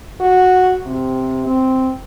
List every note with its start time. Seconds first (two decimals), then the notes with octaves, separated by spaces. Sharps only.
0.20 F#4
0.86 C3
1.46 C4